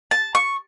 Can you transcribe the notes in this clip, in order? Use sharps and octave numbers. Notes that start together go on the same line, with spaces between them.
A5
C#6